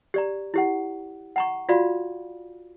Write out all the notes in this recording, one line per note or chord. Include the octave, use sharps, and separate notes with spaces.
G4 D5 A#5
E4 G4 F#5
F#5 A#5 C#6
F4 F#4 D5 F5 B5